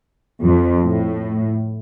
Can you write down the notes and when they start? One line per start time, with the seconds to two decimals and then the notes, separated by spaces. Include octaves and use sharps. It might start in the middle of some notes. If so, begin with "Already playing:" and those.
0.42 F2
0.84 A2